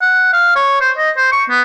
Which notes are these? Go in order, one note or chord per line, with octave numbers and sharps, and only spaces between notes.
F#5
F5
C#5
C5
D#5
C5
C#6
B3